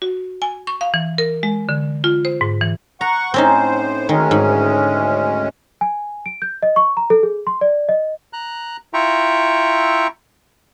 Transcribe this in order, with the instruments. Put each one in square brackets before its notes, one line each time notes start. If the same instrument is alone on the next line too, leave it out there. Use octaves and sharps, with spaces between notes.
[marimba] F#4
G#5
C#6
F5
E3
A#4
G#3
D3
F4
C5
G#2
E3
[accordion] F#5 C#6 [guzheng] A#5
[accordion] A2 C5 [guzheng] C4 C#4 D#4
[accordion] D2 G#3 C#4 [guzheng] D#3
[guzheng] G#2
[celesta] G#5
D7
G6
D#5
C#6
A#5
A4
G#4
C6
D5
D#5
[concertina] A#5 F#6
E4 F4 E5 G5 A#5 C#6